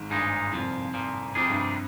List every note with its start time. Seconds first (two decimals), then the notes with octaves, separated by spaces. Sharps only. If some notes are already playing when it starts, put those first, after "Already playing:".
Already playing: G#1 G#2
0.10 G2 A#2 G#3 D#4
0.52 C2 F2 A#2 F3
0.94 C2 A#2 F3
1.35 F2 C3 D#3 G3 D4 G#4
1.50 G2